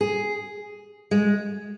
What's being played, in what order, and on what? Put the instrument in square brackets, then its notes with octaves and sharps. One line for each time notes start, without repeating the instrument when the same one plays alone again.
[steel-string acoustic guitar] G#4
G#3